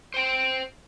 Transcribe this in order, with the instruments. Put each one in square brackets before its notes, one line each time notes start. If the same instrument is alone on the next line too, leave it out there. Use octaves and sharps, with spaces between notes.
[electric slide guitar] C5 G5